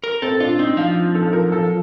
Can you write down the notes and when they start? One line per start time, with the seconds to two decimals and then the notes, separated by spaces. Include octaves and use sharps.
0.04 A#4
0.22 C4 A4
0.40 D4 F4
0.59 C4 D#4
0.77 F3 F4
1.15 A4
1.33 A#4
1.52 A4